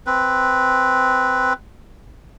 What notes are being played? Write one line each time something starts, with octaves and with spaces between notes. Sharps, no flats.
C4 B4